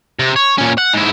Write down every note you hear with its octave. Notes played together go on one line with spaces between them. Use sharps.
C3
C#5
A#2 C#4
F#5
G#2 E4